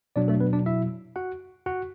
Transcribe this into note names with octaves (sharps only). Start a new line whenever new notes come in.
B2 F#3 D4 D5
A3 A4
B3 B4
D4 D5
E4 E5
F#4 F#5
F#4 F#5